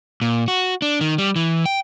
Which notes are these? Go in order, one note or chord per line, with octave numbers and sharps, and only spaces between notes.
A#2
F#4
D4
D#3
G3
E3
G5